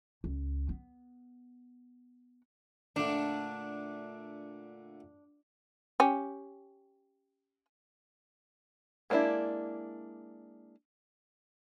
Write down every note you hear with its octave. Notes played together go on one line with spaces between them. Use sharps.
C#2
B3
A#2 D3 A3 D4
C#4 G4
G#3 A#3 B3 D4 E4